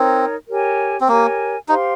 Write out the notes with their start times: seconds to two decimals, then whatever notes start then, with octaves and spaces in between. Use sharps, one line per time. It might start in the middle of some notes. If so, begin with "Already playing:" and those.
Already playing: C4 D#4 A#4 C#5
0.49 G4 A#4 C#5 G#5
1.01 C4
1.08 A#3 G4 A#4 C#5 G#5
1.68 D#4 G4 C5 F5 C6